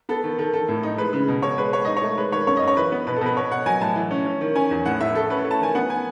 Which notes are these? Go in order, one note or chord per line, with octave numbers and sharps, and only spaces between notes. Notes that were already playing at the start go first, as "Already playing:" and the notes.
B3 A4
D#3
D#3 A4
D#3 A4
A2
D#4
G#3 B4
C#3
B2
B2 C#5
G#3 B4
G#3 C#5
D#4 D#5
C#5
A3
G#3 B4
D#3 C#5
F#2 C#5
D#5
F#2
C#5
E3 B4
B3
B2 B4
A4
B2 B4
B2 C#5
B2 F#5
F#3 G#5
A2 A5
E3
C#4
C#4
D#3
C#4 G#5
E2
A2 F#5
A2 E5
A3 A4
C#4 B4
A3
A5
D#3 G#5
B3 F#5
G#5